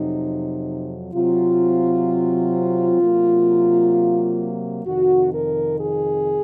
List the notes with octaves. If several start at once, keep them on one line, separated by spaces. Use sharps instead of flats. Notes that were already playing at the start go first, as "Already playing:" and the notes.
Already playing: F2 C3 F#3 D#4
C3 F#3 C4 F4
C3 F#3 A#3
F2 C3 D#3 F#4
A#4
G#4